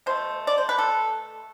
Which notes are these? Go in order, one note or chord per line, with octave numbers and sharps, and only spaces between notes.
B2 A3 C5
D5
C5
B4
A4